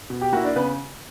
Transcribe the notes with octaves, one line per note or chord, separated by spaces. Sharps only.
B2
G4 G5
A#3 E4 F#4 F#5
D4 D5
C#3 B3 B4